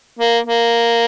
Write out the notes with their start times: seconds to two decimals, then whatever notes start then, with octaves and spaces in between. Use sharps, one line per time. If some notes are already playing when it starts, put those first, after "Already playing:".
0.19 A#3
0.47 A#3